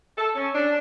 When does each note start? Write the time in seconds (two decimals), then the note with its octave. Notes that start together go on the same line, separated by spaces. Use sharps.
0.18 A4
0.36 C#4
0.54 D4